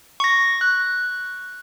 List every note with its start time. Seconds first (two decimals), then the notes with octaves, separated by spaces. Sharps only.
0.20 C#6 A#6
0.61 F#6